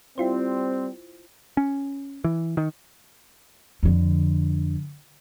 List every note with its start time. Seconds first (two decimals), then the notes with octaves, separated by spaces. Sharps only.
0.18 G3 C4 E4 F4 C5
1.57 C#4
2.24 E3
2.57 D#3
3.83 F2 D3